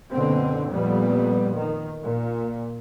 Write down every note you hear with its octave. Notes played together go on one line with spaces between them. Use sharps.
F#1 B2 D3 C4
F2 A#2 G3 B3
D#3
A#2